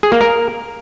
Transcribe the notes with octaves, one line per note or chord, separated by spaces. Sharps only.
G#4
A#3
A#4